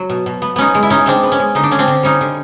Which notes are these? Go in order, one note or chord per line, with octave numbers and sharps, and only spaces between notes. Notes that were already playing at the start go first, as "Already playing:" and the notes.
Already playing: F#3
B2
B2
B3
B3 C#4 D#4
G#3
E4
G#3 C#4 D#4
G#3 C4 D4
B3
C#4
G#3
D3 D#4
D4
D3 C#4
C4 D4
D3
G3 C#4 D#4
D3